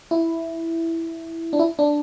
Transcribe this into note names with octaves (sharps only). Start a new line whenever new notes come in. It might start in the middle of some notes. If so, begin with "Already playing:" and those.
E4
D4
E4
D4